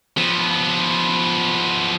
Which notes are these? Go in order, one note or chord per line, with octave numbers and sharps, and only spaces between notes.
F3 B3